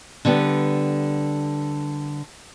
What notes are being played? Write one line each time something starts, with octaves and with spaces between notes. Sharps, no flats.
D3 G3 B3 G4